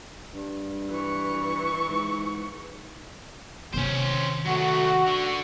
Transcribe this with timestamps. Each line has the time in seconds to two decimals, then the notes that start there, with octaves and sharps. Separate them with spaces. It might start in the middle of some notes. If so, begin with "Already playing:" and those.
0.34 G2
0.90 E3 C#6
1.88 G#2
3.74 C3 D#3 C#4 C5
4.45 F#3 A3 F#4
5.07 D3